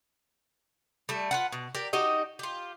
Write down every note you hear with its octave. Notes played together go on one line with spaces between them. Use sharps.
G3 A3
F4 B4 F#5
B2
G4 A#4 D5
D#4 F#4 G4 D#5
F4 G4